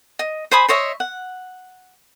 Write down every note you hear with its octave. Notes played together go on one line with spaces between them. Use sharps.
D#5
C5 G#5 B5 D#6
C5 C#5 D#5 E5
F#5